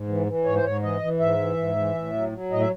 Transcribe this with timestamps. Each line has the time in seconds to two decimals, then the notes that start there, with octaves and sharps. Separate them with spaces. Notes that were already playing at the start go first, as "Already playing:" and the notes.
Already playing: G#2
0.08 E3
0.27 E3
0.45 G#2 C#5
0.55 C5
0.63 G#2 C#5
0.82 E3 D#5
1.01 E3
1.19 G#2 E5
1.38 E3
1.57 G#2
1.76 E3
1.94 A2
2.13 F#3
2.32 F#3
2.50 A2 D#5
2.60 E5